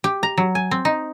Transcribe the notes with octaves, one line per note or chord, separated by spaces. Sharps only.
G4
A#5
F#3
G#5
C4
D#4